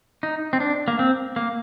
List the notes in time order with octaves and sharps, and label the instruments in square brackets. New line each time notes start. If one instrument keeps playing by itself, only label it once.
[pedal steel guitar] D#4
C4
D4
A#3
C4
A#3